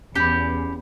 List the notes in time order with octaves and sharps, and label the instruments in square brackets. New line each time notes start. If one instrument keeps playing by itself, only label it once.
[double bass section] E2 [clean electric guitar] C#4 B5 [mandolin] G4